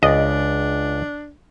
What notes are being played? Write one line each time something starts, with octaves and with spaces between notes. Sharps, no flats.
C#2 D4 D5 D#5